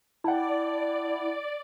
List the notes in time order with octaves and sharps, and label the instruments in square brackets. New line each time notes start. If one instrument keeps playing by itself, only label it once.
[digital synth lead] E4 [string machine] D5 [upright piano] F#5 G5 A5